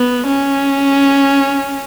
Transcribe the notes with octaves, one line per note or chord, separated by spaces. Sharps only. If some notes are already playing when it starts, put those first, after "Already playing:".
Already playing: B3
C#4